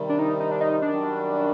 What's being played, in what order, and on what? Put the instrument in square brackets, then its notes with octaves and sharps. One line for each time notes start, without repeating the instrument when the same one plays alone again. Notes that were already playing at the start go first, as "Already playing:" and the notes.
Already playing: [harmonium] C3 D#3 G3
[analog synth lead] D4
D#4
D#4
D4
D#4
[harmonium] F#2 D#3 G3 [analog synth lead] D4